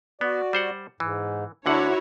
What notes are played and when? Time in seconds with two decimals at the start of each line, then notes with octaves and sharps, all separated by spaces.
0.21 B3 F#4 D5
0.53 G3 C5 F#5
1.00 G#2 E3
1.66 D2 D3 D4 E4 F#4 C#5 F#5